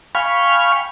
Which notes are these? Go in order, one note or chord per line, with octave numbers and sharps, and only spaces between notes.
F5 G5 G#5 B5 C#6 F6